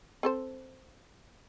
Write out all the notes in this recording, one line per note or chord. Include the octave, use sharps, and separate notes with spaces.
C4 A4 C5